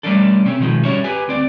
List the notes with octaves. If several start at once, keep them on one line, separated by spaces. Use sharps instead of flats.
G3 A3 A#3 C#4 D4 A4
C3 C4 C#4
B2 D#3 F3 G#3
G3 C#4 F#4 C#5 E5
G4 B4 G#5
D2 C4 D5